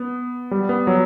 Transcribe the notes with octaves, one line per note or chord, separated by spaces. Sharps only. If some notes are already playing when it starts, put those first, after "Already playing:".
Already playing: B3
G3
B3
F#3